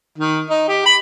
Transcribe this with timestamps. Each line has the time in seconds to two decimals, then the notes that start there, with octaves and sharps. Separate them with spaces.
0.18 D#3
0.49 D#4
0.68 G4
0.86 B5